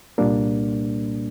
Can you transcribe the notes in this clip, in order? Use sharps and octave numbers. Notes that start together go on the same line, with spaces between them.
C2 A#2 G3 A#3 D4